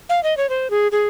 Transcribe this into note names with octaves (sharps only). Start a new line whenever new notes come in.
F5
D#5
C#5
C5
G#4
G#4